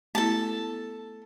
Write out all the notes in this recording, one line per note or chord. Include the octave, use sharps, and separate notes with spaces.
A3 B3 E4 A4 A5